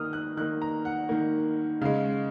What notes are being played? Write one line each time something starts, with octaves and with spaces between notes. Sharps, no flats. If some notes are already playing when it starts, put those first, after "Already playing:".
Already playing: D#3 A#3 D#6 F6
F#6
D#3 A#3 F#6
A#5
F#5
D#3 A#3
C#3 G#3 F5